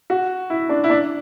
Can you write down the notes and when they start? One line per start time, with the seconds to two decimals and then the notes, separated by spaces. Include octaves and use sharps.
0.10 F#4
0.50 E4
0.69 D4
0.84 E4
0.90 D4